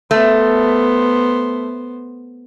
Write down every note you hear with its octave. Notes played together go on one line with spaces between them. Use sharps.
A3 B3 C5